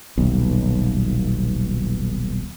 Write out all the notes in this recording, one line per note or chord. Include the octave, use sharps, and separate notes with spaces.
D#1 B1